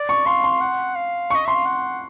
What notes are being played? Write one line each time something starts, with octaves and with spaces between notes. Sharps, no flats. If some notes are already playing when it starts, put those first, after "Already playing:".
Already playing: D5
C#6
F5 C6
C6
F#5
F5
C#6
D#5
E5 C6
F5
F#5